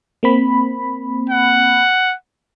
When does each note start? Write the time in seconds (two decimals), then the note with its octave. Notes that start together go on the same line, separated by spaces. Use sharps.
0.23 A#3 C4 B5
1.30 F#5